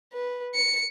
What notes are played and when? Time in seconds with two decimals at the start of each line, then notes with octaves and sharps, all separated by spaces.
0.13 B4
0.55 C#7